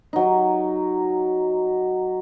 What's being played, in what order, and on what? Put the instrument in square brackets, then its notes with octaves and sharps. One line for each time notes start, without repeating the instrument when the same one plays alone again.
[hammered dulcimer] F#3 D#4